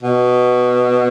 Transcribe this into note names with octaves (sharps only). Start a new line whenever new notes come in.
B2